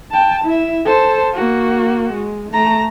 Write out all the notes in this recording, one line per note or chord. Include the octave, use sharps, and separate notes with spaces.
G5 A5
E4 E5
A4 C5
A#3 F#4
G#3
A3 A#5